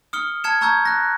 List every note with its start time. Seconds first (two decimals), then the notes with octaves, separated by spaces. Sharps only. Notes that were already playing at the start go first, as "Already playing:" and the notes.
0.13 D#6 F6 C#7 G7
0.44 A5 F6 G#6 C#7 E7
0.61 A5 A#5 C#6 E6 G6 G#6
0.85 F#6 A#6